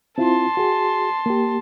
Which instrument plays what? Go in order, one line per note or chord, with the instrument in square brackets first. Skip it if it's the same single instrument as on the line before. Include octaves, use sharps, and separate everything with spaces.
[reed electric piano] C4 E4 F4 [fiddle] A5 C6
[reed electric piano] F#4 G#4
A#3 G4